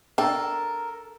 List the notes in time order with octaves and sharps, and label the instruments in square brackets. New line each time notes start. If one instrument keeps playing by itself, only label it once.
[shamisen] D4 G5 [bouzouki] A4 [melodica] A#4